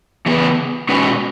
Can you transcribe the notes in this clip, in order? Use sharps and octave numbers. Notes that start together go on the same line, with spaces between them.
C#3 E3 B3 G#4 B4
B2 G#3 C#4 F#4 B4